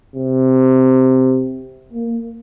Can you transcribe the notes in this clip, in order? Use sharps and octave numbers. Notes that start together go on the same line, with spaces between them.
C3
A#3